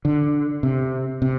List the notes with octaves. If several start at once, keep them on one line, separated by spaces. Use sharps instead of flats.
D3
C3
C3